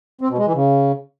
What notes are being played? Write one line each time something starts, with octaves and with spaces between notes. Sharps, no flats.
C4
B2
G#3
E3
C#3